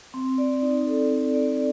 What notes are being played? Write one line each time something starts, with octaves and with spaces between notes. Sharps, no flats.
C4
D5
D#4
A4
C4
D5